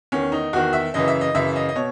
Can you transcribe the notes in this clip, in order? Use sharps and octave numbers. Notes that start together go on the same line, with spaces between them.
E2 D#3 C#4
D#4
E2 D#3 F#4
E5
F#2 C#3 E3 D#5
E5
D#5
F#2 C#3 E3 E5
D#5
D#5
B2 C#5